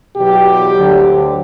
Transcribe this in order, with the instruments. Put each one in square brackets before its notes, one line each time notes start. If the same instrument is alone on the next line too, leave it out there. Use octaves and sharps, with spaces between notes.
[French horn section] E2 B2 F#3 G4
D2 D3 F#3